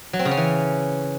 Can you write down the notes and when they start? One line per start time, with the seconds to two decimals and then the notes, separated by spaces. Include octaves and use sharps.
0.13 F#3
0.19 C4
0.25 C#3
0.31 C#4
0.37 E3